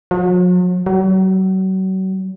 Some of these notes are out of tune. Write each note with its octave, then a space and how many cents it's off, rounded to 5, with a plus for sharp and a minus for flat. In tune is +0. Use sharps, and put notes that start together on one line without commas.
F#3 -45
F#3 +35